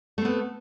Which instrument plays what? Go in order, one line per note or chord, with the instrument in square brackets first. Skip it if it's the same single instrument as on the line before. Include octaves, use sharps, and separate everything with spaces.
[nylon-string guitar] A3
C4
B3